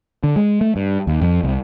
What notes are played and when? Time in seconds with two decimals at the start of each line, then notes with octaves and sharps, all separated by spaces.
0.24 D3
0.36 G#3
0.61 A3
0.76 G2
1.07 D#2
1.21 F2
1.43 C2